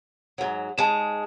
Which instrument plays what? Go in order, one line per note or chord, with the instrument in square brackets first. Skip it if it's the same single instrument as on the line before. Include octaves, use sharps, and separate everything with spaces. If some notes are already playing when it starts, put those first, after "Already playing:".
[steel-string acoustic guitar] G#2 F#3
[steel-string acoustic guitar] G#2 G#3 [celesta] A5 E7